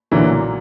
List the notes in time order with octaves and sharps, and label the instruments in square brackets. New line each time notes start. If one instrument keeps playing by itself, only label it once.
[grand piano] B1 A#2 F#3 [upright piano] D3 E3